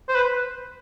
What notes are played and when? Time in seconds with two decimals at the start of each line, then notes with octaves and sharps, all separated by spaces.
0.09 C5
0.15 B4